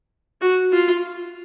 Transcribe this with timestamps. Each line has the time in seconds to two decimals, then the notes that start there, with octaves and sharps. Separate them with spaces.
0.41 F#4
0.72 F4